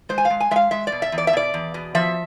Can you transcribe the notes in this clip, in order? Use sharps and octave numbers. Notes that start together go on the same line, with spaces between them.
G#3 C5
G#5
F5
G#3
G#5
G#3 E5 F5
G#3 E5
D5
B2
E5
E2
D5
E5
B2 D5
E2
B2
F3 E5